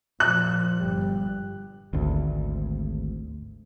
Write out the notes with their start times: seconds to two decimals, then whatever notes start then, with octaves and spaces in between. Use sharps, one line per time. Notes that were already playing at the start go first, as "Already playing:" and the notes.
0.20 A#2 F3 F#6
0.78 G1 G3
1.93 G#1 D2